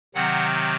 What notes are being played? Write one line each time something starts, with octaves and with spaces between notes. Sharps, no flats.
C3 D#3 F#3 C4 F#5